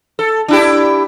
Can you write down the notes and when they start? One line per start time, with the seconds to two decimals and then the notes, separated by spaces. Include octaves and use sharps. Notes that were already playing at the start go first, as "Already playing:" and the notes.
0.19 A4
0.48 D4 E4 G4